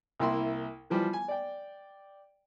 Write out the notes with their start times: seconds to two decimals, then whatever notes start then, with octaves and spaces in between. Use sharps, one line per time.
0.19 C2 A#3 E4 G5 C6
0.90 E3 F3 G3
1.13 G#5
1.28 D5 G5